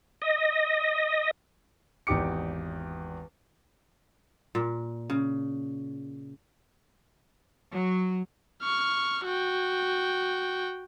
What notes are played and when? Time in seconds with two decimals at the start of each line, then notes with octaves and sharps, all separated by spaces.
0.22 D#5
2.07 G#1 E2 D#4 G4 D6 C#7
4.55 A#2
5.10 C#3
7.73 F#3
8.62 C#6 F6
9.25 F#4 G5